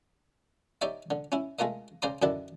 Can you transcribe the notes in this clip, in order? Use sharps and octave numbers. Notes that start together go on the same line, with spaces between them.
D#4 G4 C#5 D5 E5
D3
C#4 E4
G#3 A3 F4 A#4 D#5
C#3 C5 D5 A#5 C6 D#6
F#2 D3 D#3 D4 E4 A5